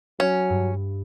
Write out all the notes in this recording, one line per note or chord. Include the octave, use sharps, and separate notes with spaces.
F#3 C#4
G2